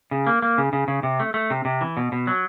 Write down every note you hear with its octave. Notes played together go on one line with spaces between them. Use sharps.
C#3
A#3
A#3
C#3
C#3
C#3
C3
A3
A3
C3
C3
E3
B2
B2
F#3